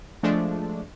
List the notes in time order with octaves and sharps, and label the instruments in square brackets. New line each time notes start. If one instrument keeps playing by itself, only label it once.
[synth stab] F3 G#3 A3 D4